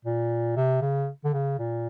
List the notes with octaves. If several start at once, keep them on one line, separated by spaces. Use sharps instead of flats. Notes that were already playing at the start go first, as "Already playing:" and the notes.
A#2
C3
C#3
D3
C#3
A#2